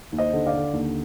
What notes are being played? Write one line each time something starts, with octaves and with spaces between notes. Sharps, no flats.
D#2
C5 D#5
D3
D5 F5
D3
D#2